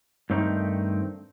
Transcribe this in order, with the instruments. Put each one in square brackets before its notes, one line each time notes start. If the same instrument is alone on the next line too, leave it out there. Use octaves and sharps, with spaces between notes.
[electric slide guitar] G2 D#3 A3 C4 D#4